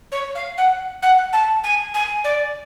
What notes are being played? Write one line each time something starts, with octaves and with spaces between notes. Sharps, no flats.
C#5
F5
F#5
F#5
A5
G#5
G#5
D5